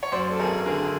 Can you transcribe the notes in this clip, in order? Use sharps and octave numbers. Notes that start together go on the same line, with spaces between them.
C#5
F#2 C5 D5
A4
G#1 G#4 A#4
D3 G#4 A#4